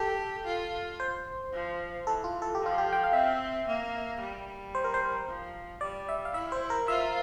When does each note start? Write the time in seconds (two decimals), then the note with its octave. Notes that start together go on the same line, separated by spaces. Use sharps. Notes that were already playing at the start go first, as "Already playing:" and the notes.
Already playing: G4 A4
0.46 F4
1.00 C5
1.53 F3
2.07 E3 A4
2.24 F4
2.42 A4
2.55 G4
2.60 F3
2.66 F4
2.78 G4
2.93 G5
3.04 F5
3.13 C4 E5
3.68 A#3
4.21 G3
4.75 C5
4.84 A#4
4.94 C5
5.28 F3
5.81 G3 D5
6.09 E5
6.25 F5
6.34 E4 E5
6.52 C5
6.70 A#4
6.88 F4 E5